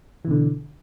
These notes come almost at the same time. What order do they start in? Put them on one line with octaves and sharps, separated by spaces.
E3 B2 D3